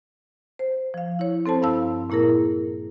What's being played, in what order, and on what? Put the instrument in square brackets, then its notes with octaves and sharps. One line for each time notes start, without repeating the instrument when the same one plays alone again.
[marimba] C5
F3 F5
E4 C#5
C4 A4 C5 A5
G2 E4 F5 A5 E6
A#2 A#3 E4 G#4 A#4